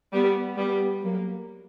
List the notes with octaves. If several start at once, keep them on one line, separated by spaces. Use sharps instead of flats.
G3 B3
G3 B3
F#3 A#3